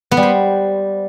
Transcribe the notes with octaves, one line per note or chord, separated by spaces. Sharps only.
B3
G3
C5